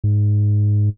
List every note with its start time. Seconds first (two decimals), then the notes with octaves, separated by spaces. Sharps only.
0.04 G#2